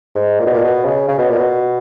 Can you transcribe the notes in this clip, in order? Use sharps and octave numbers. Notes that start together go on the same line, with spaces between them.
G#2
A#2
B2
A#2
B2
C#3
C#3
B2
A#2
B2